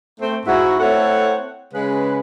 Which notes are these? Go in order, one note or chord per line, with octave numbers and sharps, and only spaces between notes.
A3 C4
G#2 E4 F#4
A3 C4 E4 A4 C#5 F#5
C#3 G#3 B4